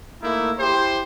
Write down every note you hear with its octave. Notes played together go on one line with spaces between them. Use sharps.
A3 A#3 D#4 E4
E4 G4 C5